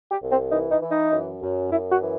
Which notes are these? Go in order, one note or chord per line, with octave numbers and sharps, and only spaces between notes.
G4
C2
C4
E3 D#4
D#4
E3
D#4
F#2
F#2
F#2 E4
F#4
E3